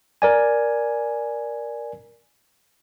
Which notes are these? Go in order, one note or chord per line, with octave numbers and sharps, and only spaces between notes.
A#4 D5 G#5